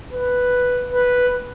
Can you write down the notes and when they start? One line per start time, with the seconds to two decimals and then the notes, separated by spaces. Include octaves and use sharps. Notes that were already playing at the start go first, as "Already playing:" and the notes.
0.13 B4
0.92 B4